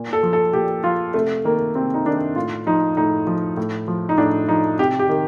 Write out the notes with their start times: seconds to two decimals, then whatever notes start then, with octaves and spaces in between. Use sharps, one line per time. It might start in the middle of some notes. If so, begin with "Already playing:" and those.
Already playing: A#2
0.13 A4
0.23 F3
0.33 A4
0.53 A#2 G4
0.84 F3 F4
1.14 C3 A3
1.44 D#3 A#3
1.75 C3 C4
1.94 D#4
2.06 D#3 D4
2.36 A2 F4
2.66 F3 D#4
2.97 A2 D#4
3.27 F3
3.57 A2
3.88 F3
4.09 D#4
4.18 A2 D4
4.48 F3 D#4
4.79 C3 G4
4.99 G4
5.09 D#3